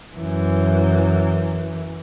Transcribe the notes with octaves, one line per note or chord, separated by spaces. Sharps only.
F#2 E3